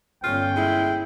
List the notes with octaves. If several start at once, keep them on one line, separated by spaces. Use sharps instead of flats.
G1 C#4 F4 G5
G#3 E4